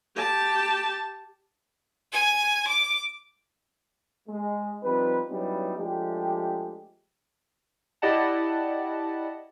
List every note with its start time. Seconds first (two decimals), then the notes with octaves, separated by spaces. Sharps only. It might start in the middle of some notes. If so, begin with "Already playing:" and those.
0.16 G4 A5
2.13 G#5
2.68 D6
4.29 G#3
4.83 F3 G3 C4 D#4 B4
5.30 F#3 G3 B3 C#4 D#4 E4
5.77 F3 G#3 A3 D4 G4
8.02 E4 G4 D5 D#5 F#5 A5